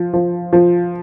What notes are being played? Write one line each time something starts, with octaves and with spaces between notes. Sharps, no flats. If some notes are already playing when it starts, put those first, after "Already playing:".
Already playing: F3
F3
F3